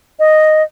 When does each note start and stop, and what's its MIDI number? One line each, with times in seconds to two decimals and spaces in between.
0.19 0.63 75